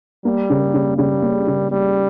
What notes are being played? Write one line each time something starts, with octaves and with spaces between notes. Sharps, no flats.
G3 A#3
C#3
C#3
C#3 G3
A#3
C#3
G3 A#3